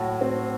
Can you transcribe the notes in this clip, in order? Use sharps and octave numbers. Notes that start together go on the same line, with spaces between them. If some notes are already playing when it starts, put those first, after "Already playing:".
Already playing: A2 F#4 F#5
C4